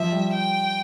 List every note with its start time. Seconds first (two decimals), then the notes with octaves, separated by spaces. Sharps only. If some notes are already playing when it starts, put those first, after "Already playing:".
Already playing: F3 E5
0.12 G3
0.33 G5